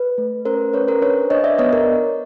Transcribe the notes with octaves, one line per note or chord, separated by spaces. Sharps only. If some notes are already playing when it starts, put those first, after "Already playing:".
Already playing: B4
A3
C#4 A#4 C5
C#4 B4 C#5
A#4 C5
D4 B4 C#5
D4 C#5 D#5
D5 E5
B3 C#5 D#5
A#4